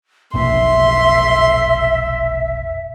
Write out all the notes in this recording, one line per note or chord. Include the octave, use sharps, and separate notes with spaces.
F1 B1 A#2 E5 C6